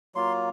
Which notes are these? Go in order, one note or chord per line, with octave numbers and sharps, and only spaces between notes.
F#3 A#3 F4 C6